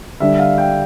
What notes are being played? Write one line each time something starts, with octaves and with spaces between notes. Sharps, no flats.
D3 G3 D4 E5
F5
G5